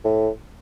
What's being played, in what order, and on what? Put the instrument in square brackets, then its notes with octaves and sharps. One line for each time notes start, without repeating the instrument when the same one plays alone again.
[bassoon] A2